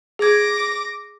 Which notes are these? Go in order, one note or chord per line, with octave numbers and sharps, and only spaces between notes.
G#4 D6 G#6 A#6